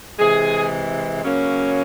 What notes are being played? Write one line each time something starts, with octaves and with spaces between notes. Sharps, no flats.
C3 E3 G#3 G#4
C#3 F#3 A#3 C#4